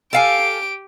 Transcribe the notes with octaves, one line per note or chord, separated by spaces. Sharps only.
G4 A4 F5 G#5 D7